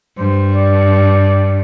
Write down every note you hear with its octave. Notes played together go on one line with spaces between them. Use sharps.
G2 C5
D5